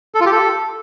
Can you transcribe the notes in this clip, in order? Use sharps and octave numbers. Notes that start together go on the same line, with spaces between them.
A4
F4
G4
A4